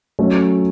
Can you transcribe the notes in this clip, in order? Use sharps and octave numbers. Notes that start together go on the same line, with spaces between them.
F#3 A3 C#4